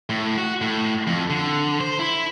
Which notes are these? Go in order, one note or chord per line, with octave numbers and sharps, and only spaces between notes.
A2
F#4
A2
F2
D3
C5
E4